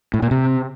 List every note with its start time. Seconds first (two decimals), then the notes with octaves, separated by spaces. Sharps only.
0.14 A2
0.22 A#2
0.31 C3